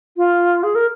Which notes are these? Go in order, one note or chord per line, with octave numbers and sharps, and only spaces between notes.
F4
G#4
A#4